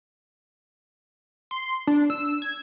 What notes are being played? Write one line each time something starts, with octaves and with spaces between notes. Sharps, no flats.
C6
D4
E6
G#6